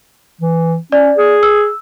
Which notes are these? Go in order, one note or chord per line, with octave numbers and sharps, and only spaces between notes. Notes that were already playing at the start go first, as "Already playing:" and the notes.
E3
C#4 D5
G#4
E6